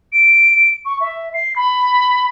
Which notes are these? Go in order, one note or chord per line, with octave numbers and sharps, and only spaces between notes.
D7
C#6
E5
C7
B5